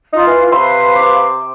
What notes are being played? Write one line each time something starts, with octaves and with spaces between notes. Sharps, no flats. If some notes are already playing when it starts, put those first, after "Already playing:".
D#4 F4
E3
C3 B4 C5 E5 F5 C6
D6